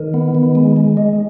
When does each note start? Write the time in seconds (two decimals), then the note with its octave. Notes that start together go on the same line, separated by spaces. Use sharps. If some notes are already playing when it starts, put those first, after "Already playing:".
Already playing: D#3
0.14 B3
0.35 D#3
0.55 G#3
0.76 G#3
0.97 G#3